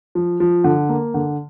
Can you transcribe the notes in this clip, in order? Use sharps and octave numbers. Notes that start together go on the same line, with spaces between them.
F3
F3
D3
A#3
D3